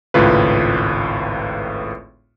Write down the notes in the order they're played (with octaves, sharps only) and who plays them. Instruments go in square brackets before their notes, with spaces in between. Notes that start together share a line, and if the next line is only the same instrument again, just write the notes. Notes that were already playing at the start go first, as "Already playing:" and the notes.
[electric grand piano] G#1 C#2 A2 F4 B4